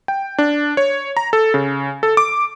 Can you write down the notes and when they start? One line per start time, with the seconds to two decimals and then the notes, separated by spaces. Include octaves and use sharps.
0.08 G5
0.38 D4
0.77 C#5
1.17 A#5
1.33 A4
1.54 C#3
2.03 A4
2.17 D6